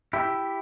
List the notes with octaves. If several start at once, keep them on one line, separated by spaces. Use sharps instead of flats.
E4 G4